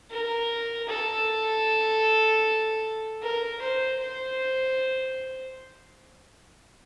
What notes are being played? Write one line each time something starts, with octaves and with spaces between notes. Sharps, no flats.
A#4
A4
A#4
C5
C5